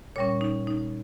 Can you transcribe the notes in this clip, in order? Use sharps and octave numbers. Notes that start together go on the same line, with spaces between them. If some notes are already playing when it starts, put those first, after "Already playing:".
A#2 G3 C#4 C#5
D#4
D#4